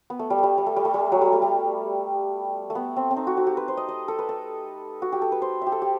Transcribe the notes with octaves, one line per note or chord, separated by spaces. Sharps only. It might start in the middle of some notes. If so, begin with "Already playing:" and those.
B3
A3
G3
A3
G3
G3
A3
G3
A3
G3
F#3
G3
A3
G3
A3
B3
C4
C4
D#4
F#4
F#4
G4
B4
C5
D#5
D#5
A4
B4
A4
F#4
G4
A4
B4
C5
G4 E5
A4
G4